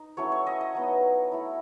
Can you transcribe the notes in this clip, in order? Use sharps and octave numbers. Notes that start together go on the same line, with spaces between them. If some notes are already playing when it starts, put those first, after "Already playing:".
Already playing: D#4
F#3 A3 C#4 E4 C#5
C#5
D#5
D#5
F#3 B3 D#4
A3 E4